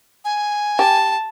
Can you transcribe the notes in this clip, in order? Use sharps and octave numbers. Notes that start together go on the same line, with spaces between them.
G#5
G4 A5